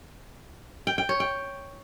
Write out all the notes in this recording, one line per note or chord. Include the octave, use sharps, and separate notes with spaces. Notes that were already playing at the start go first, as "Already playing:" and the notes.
G5
G5
C#5
G5